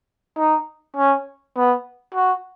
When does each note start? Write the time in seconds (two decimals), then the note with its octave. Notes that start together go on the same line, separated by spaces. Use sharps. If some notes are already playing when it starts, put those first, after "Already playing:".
0.38 D#4
0.97 C#4
1.57 B3
2.15 F#4